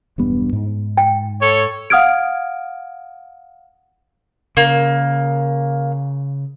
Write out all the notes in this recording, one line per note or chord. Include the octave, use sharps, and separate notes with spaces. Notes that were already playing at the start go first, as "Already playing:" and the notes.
E1 G2 B3
G#2
G5
A4 C#5
F5 F#5 D#6 F6 G#6 D7
C#3 A#3